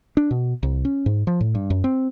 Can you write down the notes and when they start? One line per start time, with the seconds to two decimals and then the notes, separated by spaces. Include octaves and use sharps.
0.17 D4
0.31 B2
0.63 C2
0.85 C#4
1.06 G#2
1.27 F3
1.41 A2
1.55 G2
1.70 F#2
1.84 C4